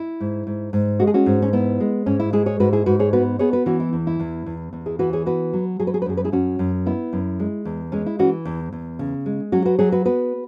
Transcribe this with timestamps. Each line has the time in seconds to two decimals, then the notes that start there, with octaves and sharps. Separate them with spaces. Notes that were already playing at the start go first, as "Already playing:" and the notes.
Already playing: E4
0.20 G#2
0.47 G#2
0.73 G#2
1.00 G#3 F#4
1.07 G#4
1.14 C#4 F#4
1.26 G#2
1.42 C#4
1.53 B3 E4
1.80 G#3
2.06 G#2 C#4
2.20 E4
2.33 G#3 E4 G#4
2.46 G#4 C#5
2.60 G#2 F#4 B4
2.73 E4 G#4
2.86 G#2 F#4 B4
2.99 G#4 C#5
3.13 B3 F#4 B4
3.39 B3 G#4 C#5
3.53 F#4 B4
3.66 E3 C#4 F#4
3.80 E4
3.93 E2
4.07 E4
4.19 E2
4.46 E2
4.73 E2
4.86 E4 G#4
4.99 E3 F#4 B4
5.13 G#4 C#5
5.26 B3 F#4 B4
5.53 F#3
5.80 F#3 G#4
5.87 B4
5.94 G#4
6.02 B4
6.06 F#2 G#4
6.17 B4
6.24 E4 G#4
6.32 F#2 C#4 F#4
6.59 F#2
6.86 B3 E4
7.13 F#2
7.39 G#3
7.65 E2
7.92 G#3 C#4
8.06 E4
8.19 E3 C#4 F#4
8.45 E2
8.72 E2
8.99 C#3
9.26 G#3
9.52 F#3 C#4 F#4
9.65 F#4 B4
9.79 F#3 G#4 C#5
9.92 F#4 B4
10.05 B3 F#4 B4